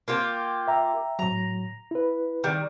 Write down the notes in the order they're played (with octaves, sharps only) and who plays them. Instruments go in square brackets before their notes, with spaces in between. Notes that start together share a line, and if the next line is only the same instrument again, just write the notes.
[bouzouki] A#3 F4 G4
[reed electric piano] E5 G5 A#5
[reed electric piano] A2 F#3 [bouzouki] A#5
[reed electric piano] E4 B4
[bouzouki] D#3 G3